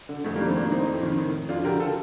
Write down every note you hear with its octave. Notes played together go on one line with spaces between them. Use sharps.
D3
F2 A3
G3 A#3
D#3 A3 C4
A2 A#3 D4
A2 C4 D#4
F2
D#3
A2
A2
F2 D4 F4
D3 G4 A#4
F4 A4